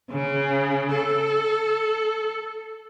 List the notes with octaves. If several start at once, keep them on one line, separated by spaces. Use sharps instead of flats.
C#3
A4